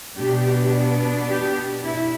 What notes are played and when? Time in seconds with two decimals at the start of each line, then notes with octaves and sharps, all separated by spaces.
0.18 B2 B3 D4 G4
1.29 G4
1.85 E4